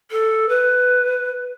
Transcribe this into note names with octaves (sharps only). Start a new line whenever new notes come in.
A4
B4